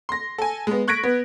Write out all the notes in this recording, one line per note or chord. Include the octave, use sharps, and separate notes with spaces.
C6 A#6
A4 G#5
G#3 B3
C#6 F#6 G#6 A#6 B6 D7
B3